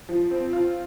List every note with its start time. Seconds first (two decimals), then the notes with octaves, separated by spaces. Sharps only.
0.09 F3
0.31 C4
0.53 F4